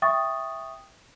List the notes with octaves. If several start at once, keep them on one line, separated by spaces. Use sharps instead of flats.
E5 G5 C#6 D#6 A6